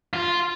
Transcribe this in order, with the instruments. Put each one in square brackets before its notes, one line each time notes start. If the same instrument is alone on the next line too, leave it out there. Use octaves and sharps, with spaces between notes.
[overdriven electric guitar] F4